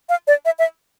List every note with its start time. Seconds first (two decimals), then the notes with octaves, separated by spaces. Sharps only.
0.09 F5
0.27 D5
0.45 E5
0.59 E5